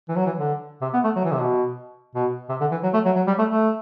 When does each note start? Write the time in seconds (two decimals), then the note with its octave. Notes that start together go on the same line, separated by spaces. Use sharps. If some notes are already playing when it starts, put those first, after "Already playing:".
0.09 E3
0.16 F#3
0.26 E3
0.38 D3
0.82 C3
0.93 B3
1.04 A3
1.16 F#3
1.24 E3
1.32 C3
1.40 B2
2.15 B2
2.49 C3
2.60 D3
2.71 E3
2.83 F#3
2.93 A3
3.05 F#3
3.16 F#3
3.27 G3
3.38 A3
3.49 A3